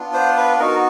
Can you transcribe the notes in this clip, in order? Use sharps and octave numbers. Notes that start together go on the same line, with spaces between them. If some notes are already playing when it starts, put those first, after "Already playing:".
Already playing: B3 D4 F4
C5
B4
B3 D#4 F#4 A#4